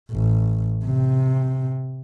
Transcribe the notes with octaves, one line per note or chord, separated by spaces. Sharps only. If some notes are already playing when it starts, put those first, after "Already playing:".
A1
C3